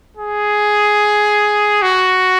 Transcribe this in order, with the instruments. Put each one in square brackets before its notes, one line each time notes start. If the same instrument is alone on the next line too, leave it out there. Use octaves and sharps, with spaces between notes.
[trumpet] G#4
F#4